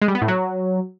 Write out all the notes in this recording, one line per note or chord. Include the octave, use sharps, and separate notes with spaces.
G#3
G3
B3
A2
F#3